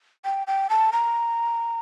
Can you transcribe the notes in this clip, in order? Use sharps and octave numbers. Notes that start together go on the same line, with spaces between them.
G5
G5
A5
A#5